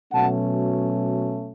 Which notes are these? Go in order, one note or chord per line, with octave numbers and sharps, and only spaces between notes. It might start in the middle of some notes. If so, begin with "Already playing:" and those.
B2 F#3 A3 C#4 F#5 A5